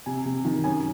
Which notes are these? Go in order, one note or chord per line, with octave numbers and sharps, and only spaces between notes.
C3 G#5
C3
D#3
F#2 G#5